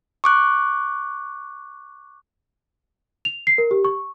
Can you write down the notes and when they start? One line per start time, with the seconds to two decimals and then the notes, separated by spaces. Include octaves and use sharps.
0.24 C#6 D6 F#6
3.25 F7
3.47 C7
3.58 A#4
3.71 G4
3.85 C#6